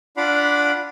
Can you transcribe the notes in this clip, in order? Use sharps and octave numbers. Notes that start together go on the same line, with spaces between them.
D4 F4 D5 F5 F#5 B5